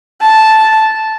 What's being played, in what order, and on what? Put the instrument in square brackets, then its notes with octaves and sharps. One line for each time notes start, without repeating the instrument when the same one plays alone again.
[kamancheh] A5